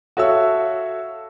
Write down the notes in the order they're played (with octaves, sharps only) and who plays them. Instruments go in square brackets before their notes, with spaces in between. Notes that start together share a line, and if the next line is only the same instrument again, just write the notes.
[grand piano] F#4 A4 C#5 E5 F5 E6